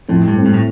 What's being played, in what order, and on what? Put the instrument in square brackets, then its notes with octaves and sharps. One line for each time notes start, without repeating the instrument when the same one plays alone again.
[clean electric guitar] F2 [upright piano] A2
[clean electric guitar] G2
[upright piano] A3 C4
[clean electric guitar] G2
A2